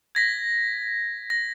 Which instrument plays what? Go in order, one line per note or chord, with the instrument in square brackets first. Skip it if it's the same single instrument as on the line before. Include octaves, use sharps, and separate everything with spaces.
[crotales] G#6 A#6 B6
A#6